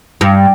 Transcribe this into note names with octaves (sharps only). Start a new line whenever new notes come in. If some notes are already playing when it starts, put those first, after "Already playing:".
G2